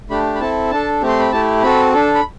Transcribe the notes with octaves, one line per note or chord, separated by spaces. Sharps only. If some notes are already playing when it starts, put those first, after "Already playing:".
A3 D4 G4 B5
B5
C4 E4 A4 A5
D4 A4 A5
A3 C4 G4
C6
B5
A3 E4 G4 A5
C4 F#4 A4 B5
D4 A4
B5